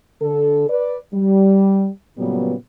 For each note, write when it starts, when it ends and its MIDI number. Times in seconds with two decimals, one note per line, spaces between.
0.21 0.69 50
0.21 0.69 69
0.69 0.97 71
0.69 0.97 74
1.14 1.88 55
2.18 2.54 46
2.18 2.54 49
2.18 2.54 54
2.18 2.54 55
2.18 2.54 59